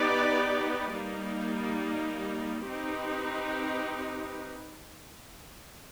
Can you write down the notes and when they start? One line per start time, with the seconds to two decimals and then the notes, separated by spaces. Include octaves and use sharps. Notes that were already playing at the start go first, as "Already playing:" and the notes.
Already playing: B3 D#4 G4 B4 D5
0.92 G3 A#3 D#4
2.68 C4 D#4 G4 B4